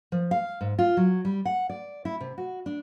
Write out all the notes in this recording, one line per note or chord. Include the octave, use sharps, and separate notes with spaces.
F3
F5
G#2
F4
F#3
G3
F#5
D5
E4
C3
F#4
D4